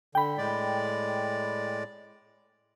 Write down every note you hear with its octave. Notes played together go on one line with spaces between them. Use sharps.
D3 G5 B5
A2 G#3 D5